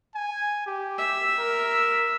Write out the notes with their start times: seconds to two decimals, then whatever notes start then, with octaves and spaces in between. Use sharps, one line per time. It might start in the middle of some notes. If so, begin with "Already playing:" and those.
0.15 G#5
0.67 G4
0.98 E5
1.39 A#4